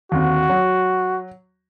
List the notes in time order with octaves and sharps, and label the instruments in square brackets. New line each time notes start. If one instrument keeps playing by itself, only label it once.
[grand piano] D#2 D3 C4 [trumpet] F#4
[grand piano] F#3